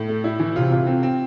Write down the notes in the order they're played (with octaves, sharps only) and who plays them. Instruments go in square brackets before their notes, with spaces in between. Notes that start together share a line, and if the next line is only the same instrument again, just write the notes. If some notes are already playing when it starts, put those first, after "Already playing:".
Already playing: [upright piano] A2
A3
E4
E3
[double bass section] C3 [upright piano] F4
[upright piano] F4
C4
C4